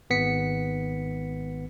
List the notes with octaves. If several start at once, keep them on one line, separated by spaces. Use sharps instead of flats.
G#1 B3 B6 C#7